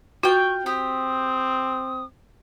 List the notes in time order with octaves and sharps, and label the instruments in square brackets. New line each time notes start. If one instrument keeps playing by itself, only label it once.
[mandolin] F4 G5 [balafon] F#4 [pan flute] C#6
[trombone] C4 [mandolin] G4 [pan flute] D#6